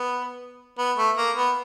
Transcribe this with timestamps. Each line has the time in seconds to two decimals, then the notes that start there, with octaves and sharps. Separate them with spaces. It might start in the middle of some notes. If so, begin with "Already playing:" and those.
Already playing: B3
0.78 B3
0.97 A3
1.17 A#3
1.36 B3